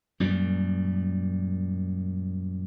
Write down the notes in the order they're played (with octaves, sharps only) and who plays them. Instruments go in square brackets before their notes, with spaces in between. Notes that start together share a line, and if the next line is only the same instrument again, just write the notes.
[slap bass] F#2 A#2 G3